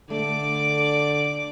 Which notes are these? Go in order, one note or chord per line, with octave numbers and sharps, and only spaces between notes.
D3 A3 D5 D6